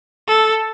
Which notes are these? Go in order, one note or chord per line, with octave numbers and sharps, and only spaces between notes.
A4